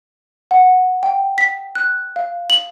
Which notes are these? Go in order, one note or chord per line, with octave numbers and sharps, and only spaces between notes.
F#5
G5
B6
F#6
F5
F#7